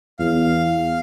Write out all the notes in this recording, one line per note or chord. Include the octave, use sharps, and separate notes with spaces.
E2 F5